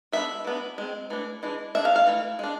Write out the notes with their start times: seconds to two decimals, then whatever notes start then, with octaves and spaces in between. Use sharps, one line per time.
0.12 G#3 B3 D4 E5
0.44 E3 B3 D4
0.78 G#3 C4
1.10 E3 A3 D4
1.43 E3 G#3 D4
1.75 G#3 D4 E5
1.85 F5
1.96 F5
2.07 E3 A3
2.39 G#3 D4